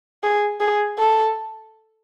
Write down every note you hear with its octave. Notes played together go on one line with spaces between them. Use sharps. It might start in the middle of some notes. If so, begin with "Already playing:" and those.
G#4
G#4
A4